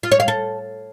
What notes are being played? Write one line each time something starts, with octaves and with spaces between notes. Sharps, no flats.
F4
C#5
F5
A4